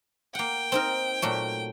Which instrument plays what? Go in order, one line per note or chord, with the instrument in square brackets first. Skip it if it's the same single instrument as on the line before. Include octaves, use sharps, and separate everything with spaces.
[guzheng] A#3 F#5 [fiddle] G5
[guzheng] C4 D#4 A#4
A#2 F#3 A3